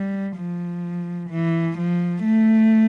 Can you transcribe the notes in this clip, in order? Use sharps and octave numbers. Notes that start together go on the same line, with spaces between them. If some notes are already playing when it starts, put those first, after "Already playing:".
Already playing: G3
F3
E3
F3
A3